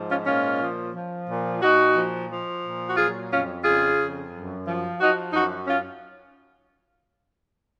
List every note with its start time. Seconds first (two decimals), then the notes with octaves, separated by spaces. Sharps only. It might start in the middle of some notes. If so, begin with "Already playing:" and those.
Already playing: G#2 F3
0.10 C#4 F4
0.26 A#2 C#4 F4
0.61 F3
0.95 F3
1.29 A#2
1.62 A#2 D#4 F#4
1.95 F3
2.30 F3
2.64 A#2
2.88 F#4
2.97 F#3 F4 G#4
3.31 F2 C#4 F4
3.64 C#3 F4 G#4
3.99 F2
4.32 F#2
4.66 F3
5.00 F3 D#4 F#4
5.33 F#2 D#4 F#4
5.67 C#4 F4